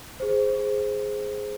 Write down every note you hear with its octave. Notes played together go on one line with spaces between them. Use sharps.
G#4 C5